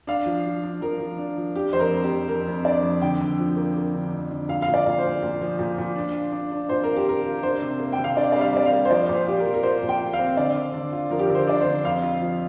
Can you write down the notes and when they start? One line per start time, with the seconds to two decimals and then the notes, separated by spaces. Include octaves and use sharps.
0.07 D4 F5
0.26 F3
0.45 F3
0.63 D4
0.81 F3 A#4
1.00 F3
1.18 D4
1.37 F3
1.56 D4 G4
1.73 F2 C5
1.80 A#4
1.92 F2
2.04 G4
2.10 F2
2.28 F2 A#4
2.48 F2
2.65 D4 D5
2.83 F2
3.01 D3 G5
3.21 D3
3.39 F3
3.57 A#3
3.76 A#3
3.94 D3
4.13 F2
4.31 D3
4.49 A#2 F5
4.62 F5
4.68 A#2
4.74 D5
4.86 A#2
4.98 C5
5.04 A#2
5.22 A#2
5.41 F3
5.59 A#2
5.78 A#2
5.96 D4
6.15 F4
6.32 D4
6.52 D4
6.69 A#2 C5
6.84 A#4
6.89 F4
6.97 G4
7.07 F4 A#4
7.24 F4
7.43 D4 C5
7.62 C3
7.80 A#3
7.93 G5
7.98 C3
8.04 F5
8.17 D4 D5
8.32 G3 D5
8.41 F5
8.53 G3 D5
8.66 F5
8.72 A#3
8.85 C5
8.90 F3 D5
9.09 A#2
9.14 C5
9.27 F4 G4
9.39 A#4
9.45 F3
9.54 A#4
9.63 F4 C5
9.83 A#2
9.89 G5
10.01 F4
10.13 F5
10.19 C4
10.37 D3 D5
10.56 D4
10.74 D3
10.93 F4
11.11 F3 A#4
11.19 G4
11.26 A#4
11.30 D3
11.35 C5
11.47 D4 D5
11.60 C5
11.66 D3
11.85 F2 F5
12.03 F4
12.21 F3